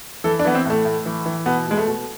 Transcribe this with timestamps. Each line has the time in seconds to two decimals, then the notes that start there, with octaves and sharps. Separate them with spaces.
0.24 E3 A4
0.39 D4
0.45 E3 B3
0.54 C4
0.65 A2 A3
0.85 A2
1.06 E3
1.26 E3
1.46 B2 B3
1.67 B2 G#3
1.77 A3
1.87 B2